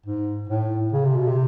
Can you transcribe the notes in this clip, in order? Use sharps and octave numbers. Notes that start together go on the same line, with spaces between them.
G#2
A2
C#3
C3
B2
C3